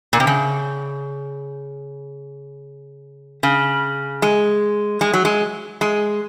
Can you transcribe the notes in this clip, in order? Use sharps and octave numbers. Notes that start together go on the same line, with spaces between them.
A#2
C3
C#3
C#3
G#3
G#3
F#3
G#3
G#3